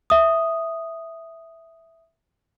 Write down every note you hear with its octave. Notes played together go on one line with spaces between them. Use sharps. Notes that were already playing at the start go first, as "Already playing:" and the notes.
E5 D#6